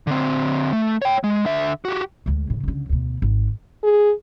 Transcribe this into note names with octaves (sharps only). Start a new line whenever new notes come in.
D3 C4
A3
C#5 G5
G#3
D3 E5
F#4 G4
D2 G#3
A2 C#3
C#2 D3
D2 B2
G#1
G#4